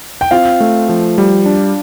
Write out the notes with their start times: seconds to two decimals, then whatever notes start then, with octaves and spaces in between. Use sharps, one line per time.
0.21 G5
0.31 C4 F4 F5
0.60 A3
0.89 F3
1.18 G3
1.46 D4